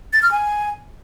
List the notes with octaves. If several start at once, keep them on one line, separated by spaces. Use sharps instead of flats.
A6
F6
G#5